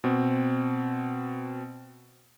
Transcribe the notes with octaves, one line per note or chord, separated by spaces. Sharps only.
B2 C4